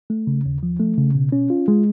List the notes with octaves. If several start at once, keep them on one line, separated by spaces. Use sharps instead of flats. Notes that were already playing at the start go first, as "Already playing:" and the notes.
A3
C#3
D#2
F3
A3
C#3
B2
C#4
F4
G#3